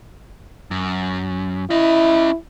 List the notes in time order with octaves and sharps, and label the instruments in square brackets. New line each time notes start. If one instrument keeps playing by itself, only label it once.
[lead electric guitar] F#2
[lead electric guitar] C#4 D#5 [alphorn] E4